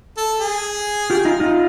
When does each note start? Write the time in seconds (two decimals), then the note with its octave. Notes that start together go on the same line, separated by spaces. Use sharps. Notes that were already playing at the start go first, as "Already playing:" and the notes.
0.17 A4
0.40 G#4
1.10 F4 G4
1.25 D#4 F4
1.40 D#4 F4